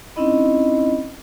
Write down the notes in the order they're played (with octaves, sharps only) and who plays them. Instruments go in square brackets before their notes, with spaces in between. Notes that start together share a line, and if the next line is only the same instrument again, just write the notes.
[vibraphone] C4 C#4 D#4 E4 D#5 B5